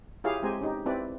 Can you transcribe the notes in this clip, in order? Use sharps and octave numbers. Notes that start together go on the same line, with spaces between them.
E4 F4 G4 G#4 C#5 F5
G#3 C4 G4 C5 G#5 A#5
C#4 D#4 G4
C4 E4 G4 B4 D5